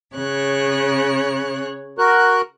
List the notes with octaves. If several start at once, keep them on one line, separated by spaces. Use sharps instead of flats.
C#3 C#5 F#6
F#4 A#4 F#6